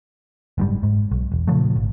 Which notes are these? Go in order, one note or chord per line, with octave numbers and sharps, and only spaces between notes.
F#1 G#2 G3
G#2
B1
E1
A#2 C#3 F3 A3
G#1